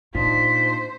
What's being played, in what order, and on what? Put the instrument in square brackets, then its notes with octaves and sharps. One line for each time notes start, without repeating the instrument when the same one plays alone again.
[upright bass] A#2 [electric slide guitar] D4 D#4 F4 [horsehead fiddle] C5 [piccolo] B6